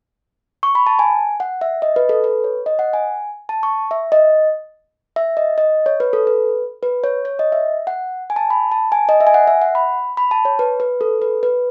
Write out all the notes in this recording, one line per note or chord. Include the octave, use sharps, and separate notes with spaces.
C#6
B5
A5
G#5
F#5
E5
D#5
B4
A4
B4
C#5
D#5
F#5
G#5
A5
C#6
E5
D#5
E5
D#5
D#5
C#5
B4
A4
B4
B4
C#5
C#5
D#5
E5
F#5
G#5
A5
B5
A5
G#5
D#5
E5
G#5
F#5
E5
F#5
B5
B5
A5
C#5
B4
B4
A4
B4
B4